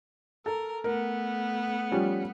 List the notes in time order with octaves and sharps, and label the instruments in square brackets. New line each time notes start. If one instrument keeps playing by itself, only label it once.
[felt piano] A4 [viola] A#4
[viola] A3 B3 [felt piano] A#4
[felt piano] F3 G3 C#4